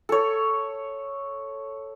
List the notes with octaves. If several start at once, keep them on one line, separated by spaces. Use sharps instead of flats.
A4 C#5